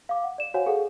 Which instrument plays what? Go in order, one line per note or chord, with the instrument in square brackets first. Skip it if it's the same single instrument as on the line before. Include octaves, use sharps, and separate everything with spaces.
[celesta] F5 D6
F#5
D5 E7
F#4 C5 C#5 F5 F#5 G#5
G#4 A4 F5 F#5